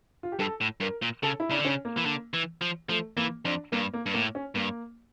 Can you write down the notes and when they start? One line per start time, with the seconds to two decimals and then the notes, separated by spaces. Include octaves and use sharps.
0.23 F4
0.32 G4
0.39 G2 A4
0.61 A2
0.80 G2 A#4
1.02 A#2
1.23 C#3 A4
1.40 E4
1.50 C#3 D4
1.59 D3
1.65 C#4
1.68 C#3
1.85 A#3
1.97 E3
2.06 D3
2.34 E3
2.61 F3
2.89 F3 A3
3.17 E3 A#3
3.45 F2 D4
3.72 G2 A#3
3.94 A#3
4.06 G2
4.14 A2 A#3
4.35 C#4
4.55 G2 A#3